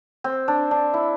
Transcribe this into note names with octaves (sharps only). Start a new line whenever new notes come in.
C4
D4
D4
E4